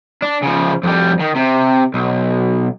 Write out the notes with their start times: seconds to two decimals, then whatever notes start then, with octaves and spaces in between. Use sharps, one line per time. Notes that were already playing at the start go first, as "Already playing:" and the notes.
0.22 D4
0.43 C#3 F3
0.83 F2 G3
1.20 D#3
1.35 C3
1.94 B1